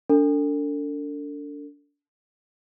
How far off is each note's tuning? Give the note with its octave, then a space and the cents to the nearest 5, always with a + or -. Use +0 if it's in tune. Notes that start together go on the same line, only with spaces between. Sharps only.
D4 -30 A4 +40